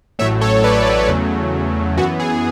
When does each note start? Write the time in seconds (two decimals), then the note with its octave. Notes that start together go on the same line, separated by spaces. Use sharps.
0.19 A1 A2 F#3 A3 C#5 E5
0.41 A4 C#5
0.64 B4 D5
1.08 E2 C#3 F#3 A3
1.97 F#2 E3 B3 F#4
2.20 G#4